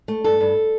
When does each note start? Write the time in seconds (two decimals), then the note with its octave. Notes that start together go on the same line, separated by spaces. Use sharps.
0.08 A3
0.24 G2 A4
0.40 G2